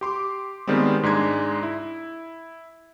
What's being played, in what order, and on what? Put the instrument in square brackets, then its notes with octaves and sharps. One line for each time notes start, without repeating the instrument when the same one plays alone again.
[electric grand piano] G4 C6 D6
D#3 G3 G#3 B3 C4
G#2 G#3 D4 G#6
E4